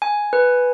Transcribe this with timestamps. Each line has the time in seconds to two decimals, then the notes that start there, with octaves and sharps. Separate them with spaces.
0.02 G#5
0.33 B4